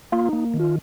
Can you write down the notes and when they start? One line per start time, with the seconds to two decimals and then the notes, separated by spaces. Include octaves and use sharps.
0.12 A#3 F4
0.28 A#3 D#4
0.54 D#3
0.60 F4